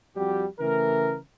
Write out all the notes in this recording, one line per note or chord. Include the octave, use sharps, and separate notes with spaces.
F2 G3 F#4 G4
C#3 E3 A3 A#4